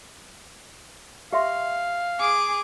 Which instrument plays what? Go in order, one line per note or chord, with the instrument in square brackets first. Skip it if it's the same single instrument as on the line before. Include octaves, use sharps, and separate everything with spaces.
[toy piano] G4 E5 C6 [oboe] F5
[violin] G#4 D6